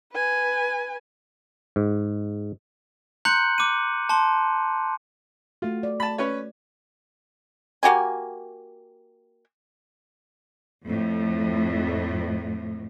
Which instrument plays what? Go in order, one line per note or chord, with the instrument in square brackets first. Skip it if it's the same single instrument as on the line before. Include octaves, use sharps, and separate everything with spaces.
[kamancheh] B4 G#5
[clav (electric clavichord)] G#2
[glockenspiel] A#5 C6 F#6 G6 C#7 F#7
D6 D#7
A5 C6
[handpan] A3 F#4 [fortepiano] F4
[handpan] D5
[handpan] A3 [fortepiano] A5 B5
[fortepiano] C#4 B4 C#5
[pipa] A#3 F#4 G4 G#5
[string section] F2 A2